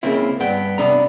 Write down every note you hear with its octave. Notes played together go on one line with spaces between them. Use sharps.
C#2 C#3 A#3 C4 E4
G2 B3 G5
C3 B3 D4 A#5